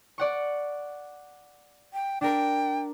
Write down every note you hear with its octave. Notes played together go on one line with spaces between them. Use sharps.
D5 F#5 C#6
G5
D4 A#4 G5